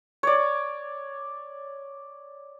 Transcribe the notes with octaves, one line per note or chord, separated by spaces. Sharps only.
C#5 D5